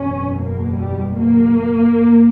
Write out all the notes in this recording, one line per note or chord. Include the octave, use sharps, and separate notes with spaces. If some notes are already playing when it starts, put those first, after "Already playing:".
Already playing: F#1 E2 B2 C#4
A#3
G3
A#3